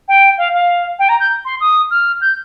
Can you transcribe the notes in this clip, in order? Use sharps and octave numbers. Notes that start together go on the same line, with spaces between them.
G5
F5
F5
G5
A#5
G6
C6
D#6
F6
G6